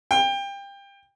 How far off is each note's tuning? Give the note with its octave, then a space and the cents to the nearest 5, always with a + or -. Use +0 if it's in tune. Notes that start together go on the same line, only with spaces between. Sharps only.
G5 +25